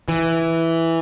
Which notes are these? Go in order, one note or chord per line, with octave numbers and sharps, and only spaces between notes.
E3